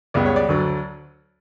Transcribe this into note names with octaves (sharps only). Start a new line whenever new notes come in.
C#2 C#3 G3 B3 D5
C#5
D5
D2 D3 F#3